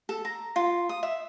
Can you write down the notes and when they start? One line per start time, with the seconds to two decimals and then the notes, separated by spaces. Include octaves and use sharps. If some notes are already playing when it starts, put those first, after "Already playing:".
0.09 A4
0.25 A#5
0.56 F4
0.89 D#6
1.03 E5